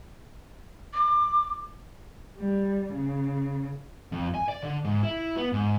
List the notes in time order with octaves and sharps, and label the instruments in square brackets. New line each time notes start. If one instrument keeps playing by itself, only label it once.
[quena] D6
[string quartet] G3
C#3
[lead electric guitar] F2
G#5
D5
D3
G#2
E4
B3
G#2